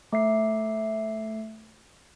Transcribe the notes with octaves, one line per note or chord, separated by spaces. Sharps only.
A3 E5 C7